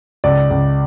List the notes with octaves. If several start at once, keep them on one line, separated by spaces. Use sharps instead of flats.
C#2 D5
C#2